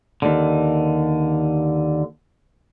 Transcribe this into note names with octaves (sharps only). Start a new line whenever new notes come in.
D#2 D3